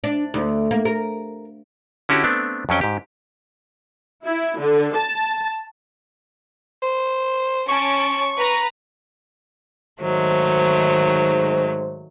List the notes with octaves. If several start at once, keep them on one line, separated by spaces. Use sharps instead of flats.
D4
D2
A#3
A#4
D3 C#4 E4 F#4 G4
A3 B3 C4 D4
F2 F#3 C#4 G5
G#2 G4
E4
D3
A5
C5
C#4 A5 C#6 D7
B4 A#5
G#2 D#3 F#3 A3 C5